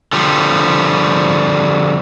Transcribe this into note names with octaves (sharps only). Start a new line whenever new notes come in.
D3 F3 G3